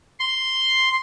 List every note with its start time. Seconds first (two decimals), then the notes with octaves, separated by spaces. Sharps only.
0.19 C6